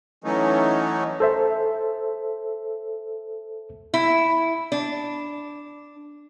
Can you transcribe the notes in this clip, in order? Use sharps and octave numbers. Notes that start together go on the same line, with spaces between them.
E3 F#3 A3 C#4 D#4
A4 C5 E5
E4
D4